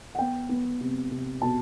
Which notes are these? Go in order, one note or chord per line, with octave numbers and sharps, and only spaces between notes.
F#5
B3 G5
B3
C3
C3
B2 A5